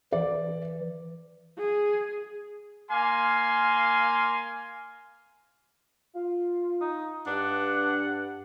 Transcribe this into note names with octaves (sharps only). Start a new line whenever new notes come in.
E3 D5
G#4
A#3 F5 G#5 C6
F4
D#4
G2 D4 F#5